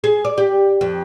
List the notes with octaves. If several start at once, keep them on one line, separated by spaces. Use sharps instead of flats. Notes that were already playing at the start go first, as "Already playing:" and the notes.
G#4
D5
G4
F2